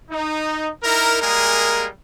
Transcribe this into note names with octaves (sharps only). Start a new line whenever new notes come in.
D#4
D#4 E4 A#4
G3 G#3 A#3 G#4 A#4